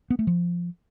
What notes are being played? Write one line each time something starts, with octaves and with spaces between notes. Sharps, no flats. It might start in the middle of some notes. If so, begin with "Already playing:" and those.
B3
A3
F3